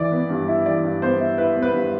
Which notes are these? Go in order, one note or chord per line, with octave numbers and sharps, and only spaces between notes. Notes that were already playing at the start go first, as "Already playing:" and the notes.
Already playing: E3 D5
B3
G2
E4
E3 D5
G2
B3 C5
E4
E4 B4
B3
B4
G2